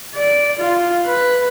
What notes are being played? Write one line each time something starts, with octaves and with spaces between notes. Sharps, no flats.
D5
F4
B4